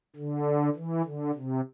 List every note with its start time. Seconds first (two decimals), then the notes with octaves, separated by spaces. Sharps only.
0.16 D3
0.75 E3
1.04 D3
1.34 C3